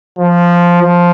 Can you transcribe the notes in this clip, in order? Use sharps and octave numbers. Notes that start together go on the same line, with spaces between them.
F3
F3